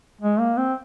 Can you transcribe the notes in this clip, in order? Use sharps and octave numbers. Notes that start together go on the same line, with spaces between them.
G#3
A#3
C4